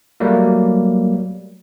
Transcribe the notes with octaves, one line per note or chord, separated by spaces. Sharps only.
F#3 G3 A3 A#3